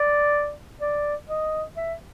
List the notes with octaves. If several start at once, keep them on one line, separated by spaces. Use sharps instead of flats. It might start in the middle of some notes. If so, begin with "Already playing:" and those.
Already playing: D5
D5
D#5
E5